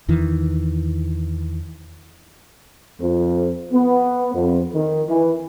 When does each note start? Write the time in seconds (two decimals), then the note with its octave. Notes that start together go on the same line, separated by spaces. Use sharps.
0.08 E2 D#3 E3
2.99 F2
3.72 B3
4.34 F2
4.73 D#3
5.09 E3